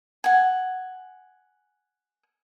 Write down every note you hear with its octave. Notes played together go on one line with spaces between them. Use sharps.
F#5 G#5